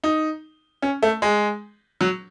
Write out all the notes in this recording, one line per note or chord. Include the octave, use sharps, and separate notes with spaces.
D#4
C#4
A3
G#3
F#3